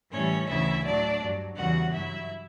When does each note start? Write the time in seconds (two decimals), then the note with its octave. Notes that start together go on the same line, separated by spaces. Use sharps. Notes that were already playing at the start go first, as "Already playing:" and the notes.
0.11 A2 E3 G3 C#4 C#5
0.47 D2 C#3 E3 E4 E5
0.83 A2 F#3 D4 D5
1.20 G2 F#3
1.55 E2 C#3 E3 G3 F#4 F#5
1.91 G2 F#3 E4 E5